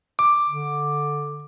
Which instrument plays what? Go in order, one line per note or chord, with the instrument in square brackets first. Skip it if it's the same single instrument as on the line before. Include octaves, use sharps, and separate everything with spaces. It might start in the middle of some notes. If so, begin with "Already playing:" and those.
[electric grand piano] D6
[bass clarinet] D3